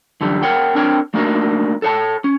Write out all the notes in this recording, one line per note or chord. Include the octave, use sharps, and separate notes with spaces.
F#2 D3 E3 G3
A#4 C#5 F#5 G5
C4 D4 A#4 C#5 G5
A3 A#3 D4 D#4 F#4 A#4
A4 C#5 A5
C#4